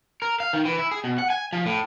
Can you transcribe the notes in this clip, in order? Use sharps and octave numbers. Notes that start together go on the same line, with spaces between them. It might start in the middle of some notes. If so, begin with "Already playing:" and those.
A#4
F5
D#3
E3
E4
G#4
B2
F#5
G#5
F3
A2